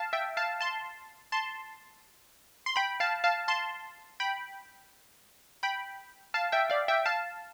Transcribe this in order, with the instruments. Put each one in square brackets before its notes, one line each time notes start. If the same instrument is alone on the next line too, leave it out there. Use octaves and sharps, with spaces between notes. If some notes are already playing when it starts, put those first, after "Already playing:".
Already playing: [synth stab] F5 A5
E5 G5
F5 A5
A5 C6
A5 C6
C6
G5 B5
F5 A5
F5 A5
A5 C6
G5 B5
G5 B5
F5 A5
E5 G5
D5 F5
E5 G5
F5 A5